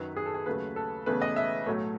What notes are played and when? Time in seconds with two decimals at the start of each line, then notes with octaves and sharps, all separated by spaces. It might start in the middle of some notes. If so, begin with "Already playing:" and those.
Already playing: F#2 D#3 F#3 B4
0.16 G#4
0.26 A4
0.34 G#4
0.46 D#2 C#3 F#3 A3 B4
0.76 A4
1.06 E1 E2 C#3 E3 A3 B4
1.22 D#5
1.36 E5
1.66 B1 A2 F#3 A3 C#5